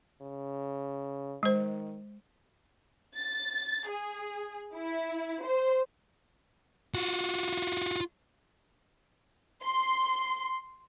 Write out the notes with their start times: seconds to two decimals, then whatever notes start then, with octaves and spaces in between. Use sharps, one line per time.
0.21 C#3
1.43 D#3 G#3 C5
3.16 A6
3.88 G#4
4.75 E4
5.45 C5
6.94 F4 F#4
9.64 C6